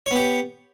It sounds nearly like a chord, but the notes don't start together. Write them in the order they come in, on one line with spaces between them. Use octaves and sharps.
C#5 B3 G4